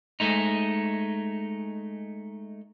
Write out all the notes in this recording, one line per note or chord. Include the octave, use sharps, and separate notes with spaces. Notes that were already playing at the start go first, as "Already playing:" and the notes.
G#3 A3 D#4